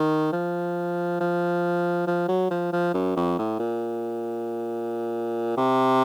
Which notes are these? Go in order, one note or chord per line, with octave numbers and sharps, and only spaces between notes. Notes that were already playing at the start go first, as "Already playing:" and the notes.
Already playing: D#3
F3
F3
F3
F#3
F3
F3
F#2
F2
A2
A#2
C3